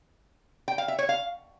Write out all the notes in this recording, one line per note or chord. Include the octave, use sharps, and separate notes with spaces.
G5
F5
E5
C#5
F5